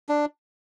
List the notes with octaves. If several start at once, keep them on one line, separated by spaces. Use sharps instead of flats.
D4